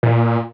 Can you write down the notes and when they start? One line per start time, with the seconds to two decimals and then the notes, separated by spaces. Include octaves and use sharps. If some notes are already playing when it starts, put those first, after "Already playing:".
0.03 A#2